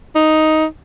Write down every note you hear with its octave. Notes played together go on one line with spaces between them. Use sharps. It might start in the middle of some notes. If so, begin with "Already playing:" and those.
D#4